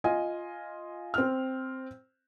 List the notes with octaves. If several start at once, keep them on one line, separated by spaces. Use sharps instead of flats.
F4 D#5 G#5
C4 F6